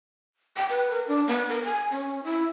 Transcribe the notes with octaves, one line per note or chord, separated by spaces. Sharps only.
G5
B4
A#4
D4
B3
A#4
G#5
C#4
E4